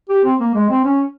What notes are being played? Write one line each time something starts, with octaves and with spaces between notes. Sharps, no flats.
G4
C4
A#3
G#3
C4
C#4